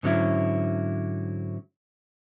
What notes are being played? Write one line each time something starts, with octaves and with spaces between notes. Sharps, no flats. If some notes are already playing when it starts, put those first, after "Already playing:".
G#2 D3 F#3 C#4 E4